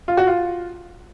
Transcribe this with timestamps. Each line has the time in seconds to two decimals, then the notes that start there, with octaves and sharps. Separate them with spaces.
0.08 F4
0.17 F#4
0.27 F4